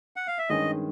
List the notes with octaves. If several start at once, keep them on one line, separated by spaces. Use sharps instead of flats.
F#5
F5
E5
G2 D#3 G#3 C#4 D#5